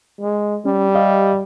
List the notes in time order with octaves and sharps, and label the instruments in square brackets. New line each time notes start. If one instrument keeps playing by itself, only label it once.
[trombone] G#3
[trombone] G3 [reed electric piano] C#4
[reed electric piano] G4 D#5 F5